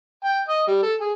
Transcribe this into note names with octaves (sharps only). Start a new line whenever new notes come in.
G5
D#5
G3
A4
G#4